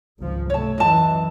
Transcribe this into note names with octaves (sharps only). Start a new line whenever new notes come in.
G#1 C#2 F3
C3 A3 C#5 A5
F#2 E3 D#5 A5